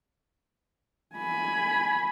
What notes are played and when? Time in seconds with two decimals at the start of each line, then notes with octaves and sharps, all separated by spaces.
1.15 G#5 B5